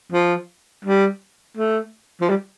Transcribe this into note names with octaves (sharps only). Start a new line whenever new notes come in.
F3
G3
A3
F3
G3